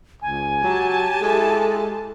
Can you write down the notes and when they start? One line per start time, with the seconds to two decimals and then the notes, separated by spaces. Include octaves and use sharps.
0.22 C#2 G#5
0.64 F#3 G4 A5
1.22 G#3 E4 A4